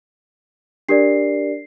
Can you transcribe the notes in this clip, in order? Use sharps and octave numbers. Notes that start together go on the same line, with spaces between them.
D4 G4 A#4 D5 C7